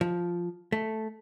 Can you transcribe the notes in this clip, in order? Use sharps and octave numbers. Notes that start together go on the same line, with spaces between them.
F3
A3